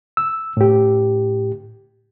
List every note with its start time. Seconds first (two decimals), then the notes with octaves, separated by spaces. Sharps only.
0.17 E6
0.57 A2 G4